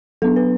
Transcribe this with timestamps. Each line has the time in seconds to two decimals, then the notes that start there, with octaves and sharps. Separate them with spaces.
0.22 F#3 B3 D4 A4
0.36 B4